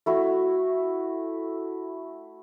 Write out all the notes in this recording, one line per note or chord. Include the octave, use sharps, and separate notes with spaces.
A3 E4 F#4